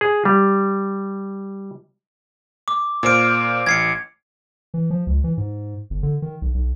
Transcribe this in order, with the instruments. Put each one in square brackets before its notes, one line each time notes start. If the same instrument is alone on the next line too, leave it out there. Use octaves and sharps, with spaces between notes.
[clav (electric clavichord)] G#4
G3
[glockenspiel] D6
[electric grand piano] A#2 C5 F6 [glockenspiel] D6 D7
[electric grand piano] A1 [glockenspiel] G#6 C7 C#7
[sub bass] E3
F3
C#2
E3
G#2
G1
D3
D#3
B1
B1